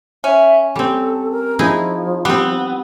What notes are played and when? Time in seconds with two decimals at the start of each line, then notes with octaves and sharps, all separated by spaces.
0.24 C#4 E5
0.76 G3 C4 A4
1.31 A#4
1.59 F3 D#4 E4 G#4
2.25 G3 B3 C4